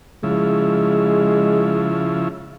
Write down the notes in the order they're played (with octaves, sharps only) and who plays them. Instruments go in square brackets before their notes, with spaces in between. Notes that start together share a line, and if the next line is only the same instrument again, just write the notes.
[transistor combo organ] C#3 F3 E4 [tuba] G#3